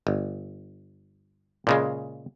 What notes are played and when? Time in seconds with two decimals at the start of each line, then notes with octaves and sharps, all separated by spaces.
0.07 G1
1.67 A#2 C#3 G#3